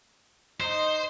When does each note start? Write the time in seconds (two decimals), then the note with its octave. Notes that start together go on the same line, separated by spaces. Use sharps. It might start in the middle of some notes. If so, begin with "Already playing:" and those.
0.60 D#4 C5